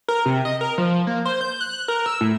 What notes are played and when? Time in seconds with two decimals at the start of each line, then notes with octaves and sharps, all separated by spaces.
0.08 A#4
0.26 C3
0.45 D#5
0.61 A#4
0.78 F3
1.07 A#3
1.25 C5
1.41 G6
1.61 F#6
1.88 A#4
2.06 E6
2.21 A2